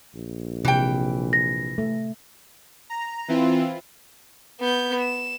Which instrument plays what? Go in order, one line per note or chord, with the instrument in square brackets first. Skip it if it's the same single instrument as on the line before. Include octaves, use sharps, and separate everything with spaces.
[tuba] A#1
[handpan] C3 [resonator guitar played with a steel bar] E3 G5
[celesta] A#6
[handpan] A3
[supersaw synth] A#5
E3 C4 E4 F4
[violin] B3 G6
E7